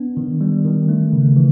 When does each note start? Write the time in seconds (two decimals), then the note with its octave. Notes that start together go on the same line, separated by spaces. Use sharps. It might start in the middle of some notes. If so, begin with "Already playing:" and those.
Already playing: B3 D4
0.17 D#3
0.41 G3
0.65 D#3
0.89 A3
1.13 C#3
1.36 E3